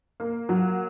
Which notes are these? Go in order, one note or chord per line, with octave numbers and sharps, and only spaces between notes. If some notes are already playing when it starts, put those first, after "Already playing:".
A#3
F#3